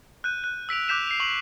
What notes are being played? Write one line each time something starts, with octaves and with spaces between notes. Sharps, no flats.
F#6 G6 D#7
F#6
E6 B6 D7 F7
D6 F#6 G6 B6 E7 F7
C7 F7
C#6 F#7